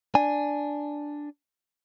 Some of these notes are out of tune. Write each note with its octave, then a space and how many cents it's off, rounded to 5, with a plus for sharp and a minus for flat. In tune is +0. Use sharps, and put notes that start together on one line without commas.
D4 +0 G#5 +0